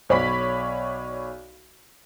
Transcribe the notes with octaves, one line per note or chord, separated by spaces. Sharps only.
B1 C#5 D5 B5 B6